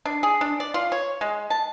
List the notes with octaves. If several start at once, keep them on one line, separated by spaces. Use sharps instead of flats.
D4
G#4
D4
D5
F4
C#5
G#3
A5